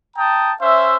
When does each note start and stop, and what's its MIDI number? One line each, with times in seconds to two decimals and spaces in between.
0.17 0.52 79
0.17 0.52 81
0.17 0.52 82
0.17 0.52 87
0.60 0.97 61
0.60 0.97 72
0.60 0.97 76